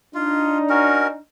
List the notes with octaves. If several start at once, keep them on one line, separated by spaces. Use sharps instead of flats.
D4 D#4 F4
C#4 F#4 A#4